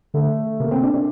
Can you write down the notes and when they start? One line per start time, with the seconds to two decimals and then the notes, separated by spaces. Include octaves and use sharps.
0.14 D3 A3
0.60 C3 A#3
0.71 C4
0.83 D4
0.94 D4